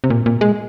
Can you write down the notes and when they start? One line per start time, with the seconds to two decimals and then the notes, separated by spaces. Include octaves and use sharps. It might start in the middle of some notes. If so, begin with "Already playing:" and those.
0.04 C3
0.10 A#2
0.26 A#2
0.41 G#3